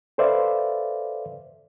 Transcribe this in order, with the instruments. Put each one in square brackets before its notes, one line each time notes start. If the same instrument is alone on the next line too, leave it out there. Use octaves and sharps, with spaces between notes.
[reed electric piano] A4 B4 C5 D5 E5 F5